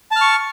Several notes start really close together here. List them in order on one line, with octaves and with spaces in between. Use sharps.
A5 F6 C#6